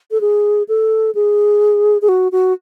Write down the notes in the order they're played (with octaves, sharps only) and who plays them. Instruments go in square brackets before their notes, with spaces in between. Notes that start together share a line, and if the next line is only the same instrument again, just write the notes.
[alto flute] A4
G#4
A4
G#4
G#4
F#4
F#4